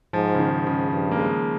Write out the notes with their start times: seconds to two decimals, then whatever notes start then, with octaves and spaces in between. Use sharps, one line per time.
0.13 G#2 F3
0.35 C#3
0.39 D#3
0.52 G#2
0.67 C#3
0.92 G2 F3
1.11 A#3
1.19 G#3